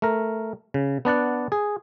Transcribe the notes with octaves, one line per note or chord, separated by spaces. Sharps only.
A3 A#4
C#3
B3 D4 D5 F#5
G#4